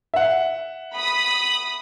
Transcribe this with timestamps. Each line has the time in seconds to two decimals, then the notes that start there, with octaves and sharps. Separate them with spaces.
0.14 E5 F#5
0.94 B5 D#6